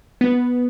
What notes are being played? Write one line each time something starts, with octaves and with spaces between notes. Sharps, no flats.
B3